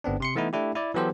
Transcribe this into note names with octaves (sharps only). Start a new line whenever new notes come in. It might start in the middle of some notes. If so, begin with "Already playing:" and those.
G1 B3 C4 D4
C3 C6 C#7
E3 A3 B3 D#4 E4
A3 D4 E4 G4
E4 D5
E3 F#3 B3 G4 A4 C5